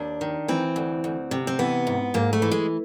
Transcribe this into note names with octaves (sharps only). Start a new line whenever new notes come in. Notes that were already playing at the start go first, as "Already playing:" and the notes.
Already playing: D#2 D4
D#3
E3 C4
D2
D2
C3
C4
E3 B3
G#2
G#2 A#3
A3
E3
G#3